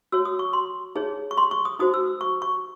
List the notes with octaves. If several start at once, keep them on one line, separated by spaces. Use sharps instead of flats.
F#4 C#5 E6
D#6
C#6
C6
D#4 G#4 C#5
C#6
C6
C#6
D#6
D#4 F#4 C5 D#6
E6
C#6
C#6